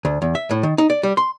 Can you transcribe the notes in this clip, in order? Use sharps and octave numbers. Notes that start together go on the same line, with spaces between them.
D2
E2
E5
A2
D#3
D#4
D5
G3
C6